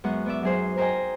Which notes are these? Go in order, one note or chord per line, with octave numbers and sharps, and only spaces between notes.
F#2 G#3 B3 F#5 C#6
B3 D5 E5
F#3 D#4 G#4 C5
A#4 C5 D#5 G5 G#5 A#5